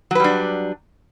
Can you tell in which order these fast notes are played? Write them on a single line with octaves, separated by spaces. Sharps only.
F#3 B4 G3 D4